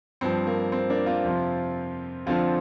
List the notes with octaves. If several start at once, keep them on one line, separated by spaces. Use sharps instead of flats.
G2 F3 C4
A#3
C4
A#3 D4
C4 F4
F2 C3 F3
F2 D3 F3 C4 F4